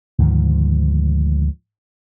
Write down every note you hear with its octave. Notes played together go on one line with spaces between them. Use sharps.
D2 G#2 D#3 F3